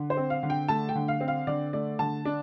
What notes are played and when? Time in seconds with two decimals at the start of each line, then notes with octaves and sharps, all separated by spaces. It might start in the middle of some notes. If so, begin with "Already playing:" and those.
Already playing: D3
0.10 C5
0.17 C4
0.30 F5
0.43 D3
0.50 G5
0.68 A3 A5
0.89 G5
0.95 D3
1.08 F5
1.21 C4
1.28 F5
1.47 D3 D5
1.73 A3 D5
1.99 D3 A5
2.25 D4